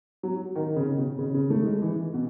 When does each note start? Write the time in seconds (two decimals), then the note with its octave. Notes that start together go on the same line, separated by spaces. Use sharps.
0.23 F#3
0.55 D#3
0.76 C#3
0.97 B2
1.19 C#3
1.34 C#3
1.50 A3
1.66 G#3
1.82 E3
2.14 B2